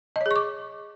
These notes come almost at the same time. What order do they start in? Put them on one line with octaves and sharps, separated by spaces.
D#5 C#5 G#4 C#6 D6